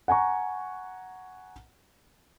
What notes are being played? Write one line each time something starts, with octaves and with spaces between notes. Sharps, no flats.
F#5 G#5 A#5 C#6